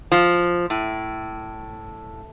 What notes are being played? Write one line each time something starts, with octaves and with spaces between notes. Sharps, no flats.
F3
A2